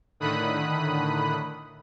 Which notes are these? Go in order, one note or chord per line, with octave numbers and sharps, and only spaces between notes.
A2 D3 D#3 B5 D#6 F#6